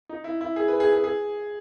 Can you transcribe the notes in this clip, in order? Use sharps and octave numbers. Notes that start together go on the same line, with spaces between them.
D#4
E4
E4
G#4
B4
G#4
G#4
G#4